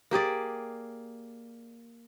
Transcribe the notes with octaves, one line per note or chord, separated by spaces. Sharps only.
A#3 G4 G#4 D5